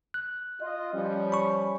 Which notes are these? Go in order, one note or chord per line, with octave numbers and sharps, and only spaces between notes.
F#6
F4 D#5
F3 G3 C#4
B5 C#6